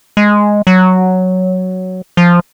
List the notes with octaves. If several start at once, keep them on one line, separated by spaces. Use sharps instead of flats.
G#3
F#3
F3